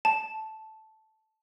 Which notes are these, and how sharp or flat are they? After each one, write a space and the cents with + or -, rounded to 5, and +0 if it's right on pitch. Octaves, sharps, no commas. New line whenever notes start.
A5 -10